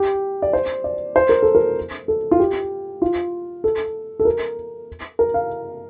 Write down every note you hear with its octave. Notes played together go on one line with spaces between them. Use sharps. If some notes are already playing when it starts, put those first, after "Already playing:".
Already playing: G4
D5
C5
D5
C5
A#4
A4
A#4
A4
F4
G4
F4
A4
A4
A#4
A#4
F5